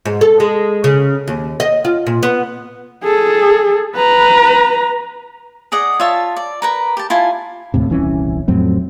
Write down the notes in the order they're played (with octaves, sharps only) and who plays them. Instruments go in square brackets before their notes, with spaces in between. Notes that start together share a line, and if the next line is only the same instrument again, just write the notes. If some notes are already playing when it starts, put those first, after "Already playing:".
[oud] G#2
A4
G#3
C#3
D#2
D#5
F4
A#2
B3
[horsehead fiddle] G#4 A4
B4 A#5
[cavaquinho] G#4 D5 D#5 F#5
F4 C#5 E5 A5
D5
A#4 B4 A#5
G4 A5
E4 F4 G#5 A5
[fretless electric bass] D#2 A2 C3
D#1 C2 E3 C#4
F2 A2 F#3 C4